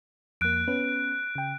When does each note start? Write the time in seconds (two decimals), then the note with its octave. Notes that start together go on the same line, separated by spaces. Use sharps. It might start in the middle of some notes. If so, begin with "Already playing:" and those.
0.41 F2 A#3 F#6 D7
0.68 B3 C#4 B4
1.35 C#3 G5